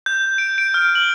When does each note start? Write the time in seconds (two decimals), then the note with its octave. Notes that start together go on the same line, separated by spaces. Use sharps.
0.06 G6
0.38 D7
0.58 D7
0.74 F6
0.95 F#7